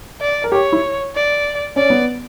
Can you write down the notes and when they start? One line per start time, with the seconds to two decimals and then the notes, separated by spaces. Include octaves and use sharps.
0.21 D5
0.44 A#4
0.52 G4 C#5
0.72 E4
1.15 D5
1.76 C#4 D5
1.90 B3